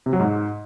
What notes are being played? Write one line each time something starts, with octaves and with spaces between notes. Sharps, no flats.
C3
F#3
G#2